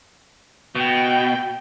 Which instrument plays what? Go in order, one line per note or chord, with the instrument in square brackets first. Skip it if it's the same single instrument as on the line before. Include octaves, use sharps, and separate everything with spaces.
[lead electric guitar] B2 [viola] G5